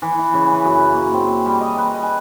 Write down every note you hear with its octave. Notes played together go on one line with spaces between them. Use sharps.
E3
E4
C#3
B4
F#2
A#3
C4
G3
D#5
B4
G#5